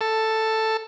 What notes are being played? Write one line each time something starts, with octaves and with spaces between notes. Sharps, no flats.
A4